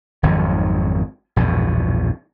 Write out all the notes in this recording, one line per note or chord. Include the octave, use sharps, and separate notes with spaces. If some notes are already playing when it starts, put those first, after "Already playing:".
G#1 F2 D#3 F#3
A#1 E2 G2 B2